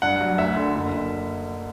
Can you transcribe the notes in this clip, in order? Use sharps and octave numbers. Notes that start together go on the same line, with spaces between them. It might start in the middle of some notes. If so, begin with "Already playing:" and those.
G2 F#5
F#3
D2 E5
D3
F#1
F#1